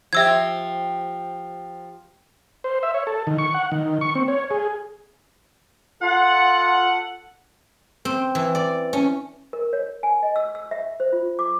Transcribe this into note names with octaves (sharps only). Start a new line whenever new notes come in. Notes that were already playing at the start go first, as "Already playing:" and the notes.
F3 G4 E5 E6 G#6
C5
E5
C#5
A4
D#3
C#6
F#5
D#3
C#6
C4
C#5
G#4
F4 A4 F#5
C4
E3
D5
C#4
A#4
C#5
G#5
D#5
E6
E6
E5
C5
F4
D6